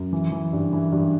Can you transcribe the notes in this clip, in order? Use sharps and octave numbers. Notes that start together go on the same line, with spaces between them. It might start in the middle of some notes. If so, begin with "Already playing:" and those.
Already playing: F#2
E3
E3
G2
E3
G2